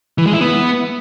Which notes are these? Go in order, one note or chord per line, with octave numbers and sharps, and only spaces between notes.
E3
G#3
E4
B3